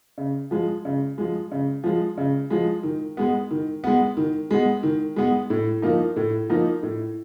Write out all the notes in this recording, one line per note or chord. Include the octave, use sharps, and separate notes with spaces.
C#3
F3 G#3
C#3
F3 G#3
C#3
F3 G#3
C#3
F3 G#3
D#3
G#3 B3
D#3
G#3 B3
D#3
G#3 B3
D#3
G#3 B3
A2
F3 A#3 D#4
A2
F3 A#3 D#4
A2